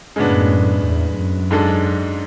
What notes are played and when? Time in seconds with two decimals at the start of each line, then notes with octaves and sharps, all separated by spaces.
0.16 F#2 A2 C#3 G#3 B3 D4
0.83 E2
1.17 F#2
1.51 G#2 G#3 D4 A4